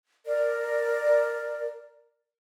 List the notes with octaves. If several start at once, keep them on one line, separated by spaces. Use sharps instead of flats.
A#4 D5